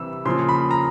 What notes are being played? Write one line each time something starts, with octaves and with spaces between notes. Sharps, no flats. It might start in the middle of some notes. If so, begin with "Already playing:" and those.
Already playing: C3 E3 G3 E6
C#3 F3 A#3 C6
B5
A#5